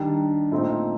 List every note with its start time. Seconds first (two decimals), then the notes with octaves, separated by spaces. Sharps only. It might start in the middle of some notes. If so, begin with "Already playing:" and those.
Already playing: D#3 G3 D4
0.52 A#2 A3 C4 D#4